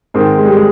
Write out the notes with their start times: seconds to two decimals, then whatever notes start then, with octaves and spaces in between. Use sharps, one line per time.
0.14 G#2 D#3 C4
0.38 G#3
0.45 G3
0.52 G#3